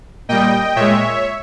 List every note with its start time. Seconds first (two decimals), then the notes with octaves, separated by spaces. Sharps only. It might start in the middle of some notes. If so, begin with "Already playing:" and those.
0.29 A#2 G3 D#5 G5
0.76 A#2 G#3 C#5 E5